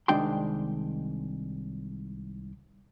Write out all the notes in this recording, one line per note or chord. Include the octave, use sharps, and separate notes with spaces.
C2 D#3 G#3 D4 G5 C6